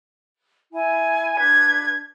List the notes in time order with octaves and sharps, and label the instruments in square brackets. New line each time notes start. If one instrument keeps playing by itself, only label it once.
[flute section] E4 G#5
[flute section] D4 B4 [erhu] G#6